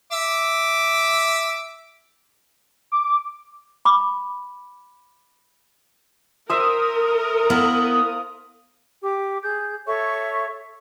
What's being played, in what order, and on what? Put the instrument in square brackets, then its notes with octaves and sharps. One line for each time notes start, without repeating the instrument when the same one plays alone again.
[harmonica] E5 D6
[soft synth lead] D6
[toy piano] B5 D6
[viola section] A#4 [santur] C5 E5 [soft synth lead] D#6
[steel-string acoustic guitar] B3 E4 [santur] F5
[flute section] G4 D6
G#4 G6
A4 C#5 E5 C#6